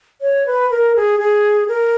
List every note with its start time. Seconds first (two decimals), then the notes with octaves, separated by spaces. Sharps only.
0.21 C#5
0.47 B4
0.71 A#4
0.96 G#4
1.19 G#4
1.69 A#4